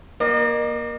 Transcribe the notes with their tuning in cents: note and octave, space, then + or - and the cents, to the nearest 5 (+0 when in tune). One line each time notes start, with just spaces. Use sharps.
A#3 +20 D#5 -40